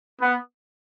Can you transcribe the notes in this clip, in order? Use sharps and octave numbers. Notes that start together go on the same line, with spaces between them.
B3